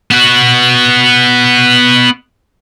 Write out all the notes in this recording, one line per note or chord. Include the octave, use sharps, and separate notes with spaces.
B3 F#4